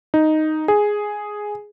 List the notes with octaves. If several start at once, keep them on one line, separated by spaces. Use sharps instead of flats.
D#4
G#4